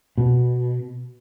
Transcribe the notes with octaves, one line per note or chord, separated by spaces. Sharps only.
B2